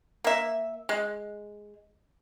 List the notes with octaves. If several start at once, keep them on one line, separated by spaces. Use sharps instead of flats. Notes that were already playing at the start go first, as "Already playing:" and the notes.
A#3 E5
G#3